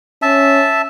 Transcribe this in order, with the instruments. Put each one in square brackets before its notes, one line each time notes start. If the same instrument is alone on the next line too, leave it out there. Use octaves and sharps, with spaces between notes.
[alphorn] C#4 [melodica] E5 A5